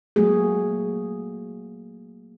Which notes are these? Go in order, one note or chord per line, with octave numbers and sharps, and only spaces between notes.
F#3 A3 A#3 F#4 G#4